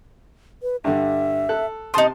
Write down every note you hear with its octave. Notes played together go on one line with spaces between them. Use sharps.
B4
G2 D3 E5
A4 F#6
C3 D#4 A5 C6 D#6